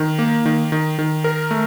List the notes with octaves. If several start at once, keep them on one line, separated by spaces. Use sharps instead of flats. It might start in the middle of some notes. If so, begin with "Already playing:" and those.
Already playing: D#3
A#3
D#3
D#3
D#3
A#4
A3